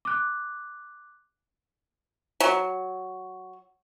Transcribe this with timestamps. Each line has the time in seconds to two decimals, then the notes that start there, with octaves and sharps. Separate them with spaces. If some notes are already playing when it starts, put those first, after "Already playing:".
0.05 D6 F#6
2.40 F#3